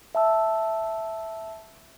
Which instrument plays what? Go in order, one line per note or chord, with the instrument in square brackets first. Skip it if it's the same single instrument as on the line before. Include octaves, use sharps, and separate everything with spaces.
[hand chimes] E5 A5 E6